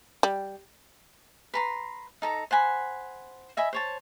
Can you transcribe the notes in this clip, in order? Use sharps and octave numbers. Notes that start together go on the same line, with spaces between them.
G3
B4 A#5 C6
D#4 A4 A#5
C5 F#5 G#5 B5
D#5 E5 G#5 B5
C5 C#5 A5